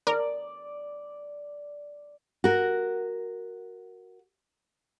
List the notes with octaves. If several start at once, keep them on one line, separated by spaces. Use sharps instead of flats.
A#4 D5
F#4 A#4